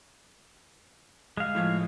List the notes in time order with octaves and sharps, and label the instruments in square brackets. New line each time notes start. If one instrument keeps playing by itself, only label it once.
[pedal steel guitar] G#3 F5
[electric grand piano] A2 F3 G#6